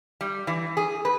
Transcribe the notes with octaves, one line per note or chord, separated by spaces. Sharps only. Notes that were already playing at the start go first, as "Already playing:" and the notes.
G3
E3
G#4
B4